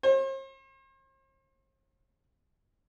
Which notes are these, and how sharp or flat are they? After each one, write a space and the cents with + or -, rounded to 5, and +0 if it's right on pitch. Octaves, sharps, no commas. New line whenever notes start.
C5 +45